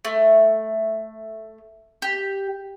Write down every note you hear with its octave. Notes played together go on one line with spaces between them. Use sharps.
A3
G4